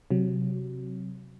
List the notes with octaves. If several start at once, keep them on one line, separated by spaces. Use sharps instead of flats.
C3 F#3